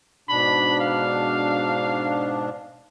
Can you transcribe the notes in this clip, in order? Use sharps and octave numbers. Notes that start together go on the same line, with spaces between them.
G#2 B2 D4 B5
F5